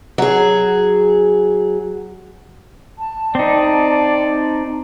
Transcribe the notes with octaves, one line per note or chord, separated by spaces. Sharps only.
F#3 G#4
A5
C4 D#4 D5